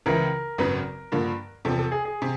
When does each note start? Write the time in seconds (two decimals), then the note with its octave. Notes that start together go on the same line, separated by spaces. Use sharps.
0.06 C#2 C#3 E3 A#4
0.58 G#1 F#2 C#3 F#3 B3
1.12 G2 D3 F3 A#3
1.65 E2 C3 F3 A4
1.79 A4
1.92 G#4
2.05 G#4
2.22 C3